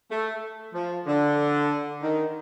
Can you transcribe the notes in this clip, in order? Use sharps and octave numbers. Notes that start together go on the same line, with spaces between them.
A3
F3
D3
D#3